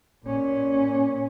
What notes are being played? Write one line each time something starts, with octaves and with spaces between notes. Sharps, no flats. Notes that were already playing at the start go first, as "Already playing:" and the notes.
A#2 C#4